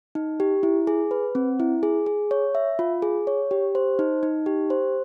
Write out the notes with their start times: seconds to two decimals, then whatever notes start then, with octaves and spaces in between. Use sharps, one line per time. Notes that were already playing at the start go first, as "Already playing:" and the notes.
0.15 D#4
0.40 G4
0.63 E4
0.87 G#4
1.11 B4
1.35 C4
1.60 E4
1.83 G#4
2.06 G#4
2.31 C#5
2.55 E5
2.79 F4
3.02 G#4
3.27 C#5
3.51 G4
3.75 C5
3.99 D#4
4.23 D#4
4.46 G4
4.70 C5